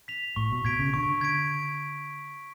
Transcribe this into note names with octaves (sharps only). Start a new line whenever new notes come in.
B6 F7
A2 C#6
B2
B2 G#6 B6 D7
C#3
D3 C#6
G#6 B6 D7